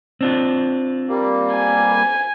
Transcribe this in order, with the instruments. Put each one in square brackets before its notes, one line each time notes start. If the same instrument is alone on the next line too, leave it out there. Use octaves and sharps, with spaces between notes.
[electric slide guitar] C4 D4 F4
[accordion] G3 A#3
[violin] G#5